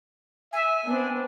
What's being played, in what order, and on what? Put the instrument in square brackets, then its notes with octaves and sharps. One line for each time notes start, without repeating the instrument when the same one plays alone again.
[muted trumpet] E5 [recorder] G#5
[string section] B3 C4 [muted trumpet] D4